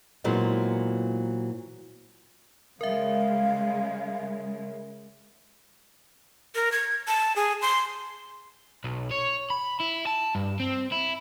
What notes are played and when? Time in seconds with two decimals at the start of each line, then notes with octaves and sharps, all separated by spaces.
0.24 A#2 E3 F#3 G#3 B3 C4
2.81 C#3 G#3 A#4 E5 F5
6.55 A#4
6.72 G#6
7.07 A5
7.36 G#4
7.62 C6
8.84 B1
9.11 C#5
9.50 B5
9.80 E4
10.07 A5
10.35 G2
10.60 C4
10.92 E4